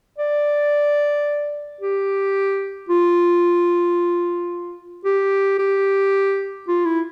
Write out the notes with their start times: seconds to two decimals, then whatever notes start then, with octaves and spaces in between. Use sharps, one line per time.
0.19 D5
1.81 G4
2.89 F4
5.05 G4
5.59 G4
6.68 F4
6.85 E4